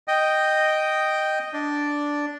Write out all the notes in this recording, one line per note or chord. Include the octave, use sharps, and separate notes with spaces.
D#5 G5
D4 D5